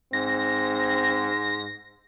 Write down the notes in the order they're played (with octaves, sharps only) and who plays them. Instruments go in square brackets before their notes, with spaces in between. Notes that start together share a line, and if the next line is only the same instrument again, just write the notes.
[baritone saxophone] G#2 [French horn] C4 [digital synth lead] A#6